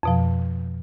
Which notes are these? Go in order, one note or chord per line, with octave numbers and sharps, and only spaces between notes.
F2 B2 F3